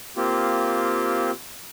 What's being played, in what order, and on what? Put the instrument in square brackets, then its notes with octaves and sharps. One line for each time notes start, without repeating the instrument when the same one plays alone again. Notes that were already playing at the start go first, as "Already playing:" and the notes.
[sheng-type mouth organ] A#3 C4 F4 G4